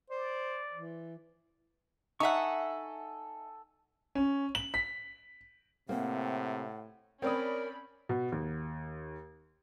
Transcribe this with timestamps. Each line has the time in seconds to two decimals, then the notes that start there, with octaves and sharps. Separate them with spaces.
0.10 C5 D5
0.73 E3
2.20 D#4 A4 E5 F#5 G#5 C#6
4.15 C#4
4.55 F#7
4.74 B6
5.89 A2 C3 A#3 C4 F#5
7.22 C4 C#4 A#4 C#5 D5 B5 D#6
8.09 B2
8.32 D#2